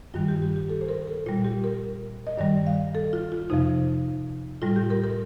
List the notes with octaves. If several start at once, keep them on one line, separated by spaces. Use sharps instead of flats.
G2 D#3 G3 F4
G4
G4
G4
A4
C5
A#4
A4
A#2 G3 F4
G4
A#4
D#5
G2 D#3 G3 D5
F5
A4
F4
F4
F2 C3 F3 D#4
A2 G3 F4
G4
A#4
A#4